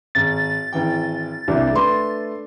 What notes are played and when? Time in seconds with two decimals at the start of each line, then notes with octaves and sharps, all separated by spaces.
0.15 G#1 A6
0.73 G#1 E3 G5
1.48 C2 C3 D4
1.73 A3 B4 C6